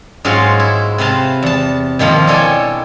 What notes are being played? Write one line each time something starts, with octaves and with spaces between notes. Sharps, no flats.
G#2 F#3 G#3 F4 F#4 F5
E4
C3 B4 C5 F5 A5
E2 A5
B2 D#3 F3 A#3
D4 E4 A4 C#5 G5 G#5